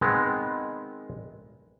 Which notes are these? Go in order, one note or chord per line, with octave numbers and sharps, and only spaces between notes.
D#3 G#3 B3 C4